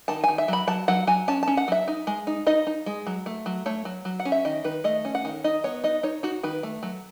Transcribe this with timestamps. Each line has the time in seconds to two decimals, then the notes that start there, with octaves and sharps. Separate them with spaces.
0.08 D#3 A5
0.24 D#3 G#5
0.38 E5
0.48 F#3 B5
0.67 F#3 A5
0.88 F#3 F#5
1.07 F#3 G#5
1.28 C#4 A5
1.43 C#4 A5
1.57 F#5
1.68 F#3 E5
1.88 D#4
2.07 G#3
2.27 D#4
2.47 D#4 D#5
2.67 D#4
2.86 G#3
3.07 F#3
3.26 A3
3.46 F#3
3.66 A3 C#5
3.85 F#3
4.05 F#3
4.20 F#5
4.25 C#4
4.32 E5
4.45 D#3 D#5
4.64 D#3 B4
4.84 A3 D#5
5.05 C#4
5.15 F#5
5.25 D#3
5.44 D#4 D#5
5.64 B3 C#5
5.84 D#4 D#5
6.03 D#4 C#5
6.23 D#4 F#4
6.43 D#3 B4
6.63 A3
6.83 F#3